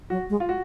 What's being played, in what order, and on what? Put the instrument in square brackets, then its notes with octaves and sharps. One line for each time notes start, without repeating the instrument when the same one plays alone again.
[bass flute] F#3 [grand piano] F#4
[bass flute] G#3
[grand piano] F4
F#4